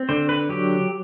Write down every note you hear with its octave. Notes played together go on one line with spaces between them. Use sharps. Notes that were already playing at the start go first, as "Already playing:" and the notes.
Already playing: C4
D3 C5
B4
F#3 G4